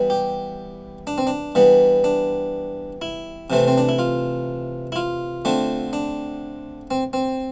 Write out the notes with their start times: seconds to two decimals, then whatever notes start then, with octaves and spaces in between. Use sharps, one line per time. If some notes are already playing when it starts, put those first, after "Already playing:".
Already playing: E3 G3 B3
0.10 G4
1.07 D4
1.18 C4
1.27 D4
1.55 E3 G3 B3
2.04 D4
3.02 E4
3.50 C3 E3 A3 C4
3.68 C4
3.78 D4
3.89 E4
3.99 F4
4.92 E4
4.96 F4
5.45 D3 A3 C4
5.93 D4
6.91 C4
7.13 C4